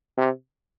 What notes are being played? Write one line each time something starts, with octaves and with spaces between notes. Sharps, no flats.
C3